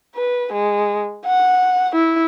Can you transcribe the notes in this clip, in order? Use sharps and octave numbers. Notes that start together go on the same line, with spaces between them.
B4
G#3
F#5
E4